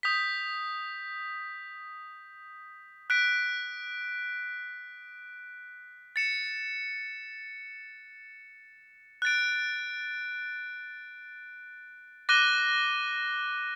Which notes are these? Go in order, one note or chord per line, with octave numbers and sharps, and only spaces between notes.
D#6 G6 B6
F#6 B6 D7
A6 C#7 E7
F#6 A6 D7
D6 F#6 A#6 D#7 G7